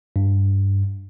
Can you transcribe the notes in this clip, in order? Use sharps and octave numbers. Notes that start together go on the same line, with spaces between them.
G2